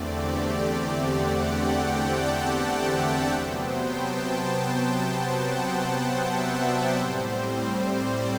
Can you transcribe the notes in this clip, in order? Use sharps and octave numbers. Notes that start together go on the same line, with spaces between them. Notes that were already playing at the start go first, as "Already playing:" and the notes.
Already playing: E2 D3 A3 C4 D5
G4
G4
F#5
G5
A5
G5
E5
C3 F#3 B3 C5
G5
A5
G5
G5
F#5
F#5
E5
D5
A2 G3 C4 C5
C5
D5